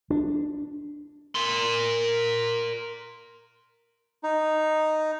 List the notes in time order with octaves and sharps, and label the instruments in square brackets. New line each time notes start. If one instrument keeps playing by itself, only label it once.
[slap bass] D4
[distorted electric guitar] A#4 C6
[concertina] D#4